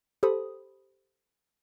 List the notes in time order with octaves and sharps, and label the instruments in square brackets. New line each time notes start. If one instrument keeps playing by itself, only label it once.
[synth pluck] G4 A4 C5 B5 D#6